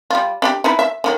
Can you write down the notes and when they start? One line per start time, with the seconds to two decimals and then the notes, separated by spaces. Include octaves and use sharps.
0.10 G3 F4
0.42 D4 D#4 G4
0.64 D#4 E4 B4
0.79 E5
1.04 D3 D#3 F#3